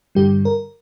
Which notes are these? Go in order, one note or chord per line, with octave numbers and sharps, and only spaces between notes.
G2 D3 G3 G4
A#4